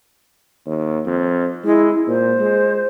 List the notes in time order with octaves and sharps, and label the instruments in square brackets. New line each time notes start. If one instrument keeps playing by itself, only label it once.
[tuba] D#2
F2
[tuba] G#3 [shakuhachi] E4
[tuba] A#2 [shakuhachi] C5
[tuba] G#3